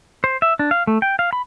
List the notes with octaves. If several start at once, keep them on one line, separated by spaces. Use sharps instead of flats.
C5
E5
D4
F5
A3
G5
F5
B5